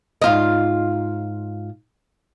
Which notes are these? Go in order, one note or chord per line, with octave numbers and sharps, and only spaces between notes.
G#2 F4 D#5